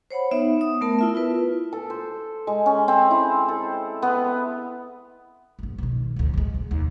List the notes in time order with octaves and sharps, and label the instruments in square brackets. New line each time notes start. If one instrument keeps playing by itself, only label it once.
[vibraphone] C5 C#5 F#5 B5
B3 D#4 E5
D#6
A3 B3 A#4 A5
E4 F4 E5
E4 F4 B4
[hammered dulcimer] A4
C5
G#3
C#4
C4
E4
A4
B3
[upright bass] A#1 F#2
B2 D#3
D2 A2
F#3 G#3
C3
D#2